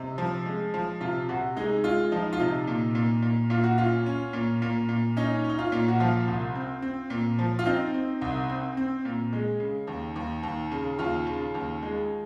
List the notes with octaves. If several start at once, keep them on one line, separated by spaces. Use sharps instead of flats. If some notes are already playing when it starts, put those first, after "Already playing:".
Already playing: C3 D#4
F3
G#3
F3
C3 F4
C3 F#4
G#3 D#4
G#3 F4
F3 D#4
F4
C3 D#4
A#2
A#2
A#2
A#2 F4
F#4
C#4 F4
C#4
A#2
A#2
A#2
C#4 D#4
C#4
D#4
F4
A#2
F#4
F3 F4
C2
C4
C4
A#2
F3
F4
C4 D#4
C4
C2
C4
C4
A#2
G#3
C#3
D#2
D#2
D#2
C#3
D#2 F4
C#3
D#2
G#3